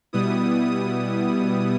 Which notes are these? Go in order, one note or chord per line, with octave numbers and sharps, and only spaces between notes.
B2 G3 B3 E4 D#6
D#6